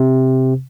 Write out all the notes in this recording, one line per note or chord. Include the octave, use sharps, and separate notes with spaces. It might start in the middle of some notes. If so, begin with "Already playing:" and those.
Already playing: C3